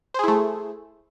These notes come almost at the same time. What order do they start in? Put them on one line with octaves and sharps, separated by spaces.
C5 G#4 E4 A3